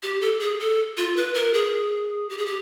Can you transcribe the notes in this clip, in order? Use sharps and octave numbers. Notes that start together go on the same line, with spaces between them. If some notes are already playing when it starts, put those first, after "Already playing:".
G4
A4
G#4
A4
F4
B4
A#4
G#4
G4
G#4
G4